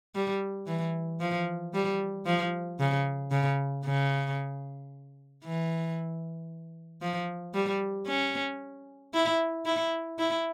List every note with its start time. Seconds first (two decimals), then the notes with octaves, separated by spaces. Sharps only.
0.15 G3
0.67 E3
1.20 F3
1.74 G3
2.26 F3
2.80 C#3
3.31 C#3
3.85 C#3
5.44 E3
7.02 F3
7.54 G3
8.07 C#4
9.14 E4
9.66 E4
10.19 E4